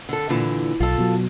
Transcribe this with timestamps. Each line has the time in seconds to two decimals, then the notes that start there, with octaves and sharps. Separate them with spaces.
0.09 D3 A4
0.29 A#2 D3 E3
0.80 B1 F4 A4
0.98 B2 F#3